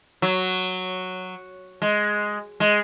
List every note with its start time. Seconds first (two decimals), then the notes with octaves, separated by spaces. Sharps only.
0.22 F#3
1.82 G#3
2.60 G#3